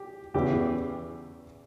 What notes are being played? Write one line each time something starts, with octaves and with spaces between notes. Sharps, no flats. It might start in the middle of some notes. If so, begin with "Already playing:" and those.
Already playing: G4
E2 C#3 E3 G4